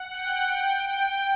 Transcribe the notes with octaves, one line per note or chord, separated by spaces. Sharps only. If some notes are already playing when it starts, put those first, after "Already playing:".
Already playing: F#5
G5
G5